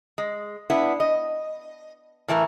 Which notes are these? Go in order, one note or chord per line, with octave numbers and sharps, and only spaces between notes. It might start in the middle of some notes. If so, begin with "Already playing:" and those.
G#3
B3 D4 E4
D#5
A2 E3 E4 A#4